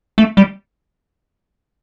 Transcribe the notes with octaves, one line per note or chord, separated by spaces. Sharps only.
A3
G3